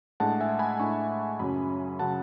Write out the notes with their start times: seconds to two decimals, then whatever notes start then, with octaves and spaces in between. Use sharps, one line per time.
0.20 A2 G#3 D4 F#5 A5
0.40 E5 G#5
0.59 G#5 B5
0.79 A2 G#3 D4 A5 C#6
1.39 F#2 C#3 F#3 C#4 G#5 B5
1.99 C#3 F#3 C#4 F#5 A5